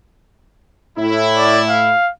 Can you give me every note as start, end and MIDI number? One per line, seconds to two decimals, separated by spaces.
0.99 1.91 45
0.99 1.91 64
1.37 1.61 74
1.69 2.11 77